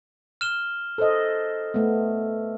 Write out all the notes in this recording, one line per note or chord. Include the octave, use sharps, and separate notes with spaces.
F6 E7 G7
A4 C5 D#5
A3 B3